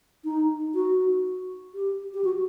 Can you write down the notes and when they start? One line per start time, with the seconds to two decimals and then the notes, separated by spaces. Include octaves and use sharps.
0.24 D#4
0.74 F#4
1.75 G4
2.14 G4
2.24 F#4